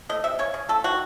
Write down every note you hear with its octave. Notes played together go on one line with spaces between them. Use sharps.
A3 D#5
C3 E5
C#3 C#5
C#3
A3 A4
D#3 F#4